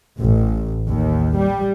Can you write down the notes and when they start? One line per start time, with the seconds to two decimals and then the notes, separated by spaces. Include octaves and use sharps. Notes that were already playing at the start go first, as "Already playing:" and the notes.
0.20 A1
0.87 D#2
1.38 G3